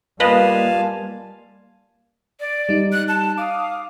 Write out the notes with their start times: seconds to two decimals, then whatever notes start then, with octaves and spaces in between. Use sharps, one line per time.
0.20 G3 A#3 F4 B4 D#5 F5 G#5 A5
2.40 D5
2.69 G3 D#4
2.93 F#6
3.09 A5
3.38 F5 D6 D#6